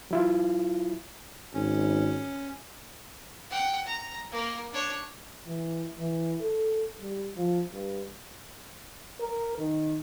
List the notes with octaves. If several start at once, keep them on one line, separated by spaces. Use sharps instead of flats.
F#3 E4 F4
G#1 C#4
F#5 G5
A#5
A#3 A#4
D4 C#5
E3
E3
A4
G3
F3
G2
A#4
D#3